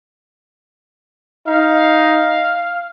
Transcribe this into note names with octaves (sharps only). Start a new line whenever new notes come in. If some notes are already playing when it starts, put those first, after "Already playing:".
D#4 F5